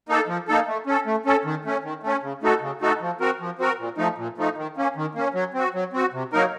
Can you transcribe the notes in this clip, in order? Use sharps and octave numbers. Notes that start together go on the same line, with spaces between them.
A#3 D#4 A4
F3
A#3 D#4 A4
A3
C#4 A4
A3
C#4 A4
D#3
A3 C#4
D#3
A3 C#4
C#3
A3 D#4 F#4 A4
C#3
A3 D#4 F#4 A4
F3
C4 F#4 A#4
F3
C4 F#4 A#4
A#2
F3 A3 D#4
A#2
F3 A3 D#4
D#3
A#3 C#4
D#3
A#3 C#4
F#3
C4 F#4
F#3
C4 F#4
C3
F#3 A#3 D#4 A#4